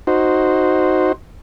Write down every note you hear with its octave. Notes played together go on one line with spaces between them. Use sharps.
D#4 F#4 C5